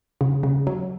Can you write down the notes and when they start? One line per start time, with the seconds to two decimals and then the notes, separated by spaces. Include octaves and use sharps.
0.21 C#3
0.43 C#3
0.67 F#3